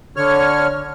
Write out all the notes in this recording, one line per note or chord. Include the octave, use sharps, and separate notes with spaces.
D3 C#5 F6